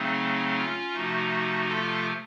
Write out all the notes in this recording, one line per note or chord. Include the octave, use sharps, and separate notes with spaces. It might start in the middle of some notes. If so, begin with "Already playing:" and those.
Already playing: C#3 F#3 A3 C4 D#4
C#4 F4
C3 F3 A3 D#4 F#4
F4 A4